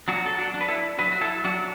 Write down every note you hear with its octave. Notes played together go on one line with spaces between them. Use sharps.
F#3 D4 F#4
A4
D4 F#4
D4
B4
E4 A4
F#3 F#4 B4
F#4
E4 A4
F#3 D4 F#4